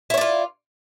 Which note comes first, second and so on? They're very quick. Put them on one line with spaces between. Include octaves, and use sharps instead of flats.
E4 C#5 D5 F4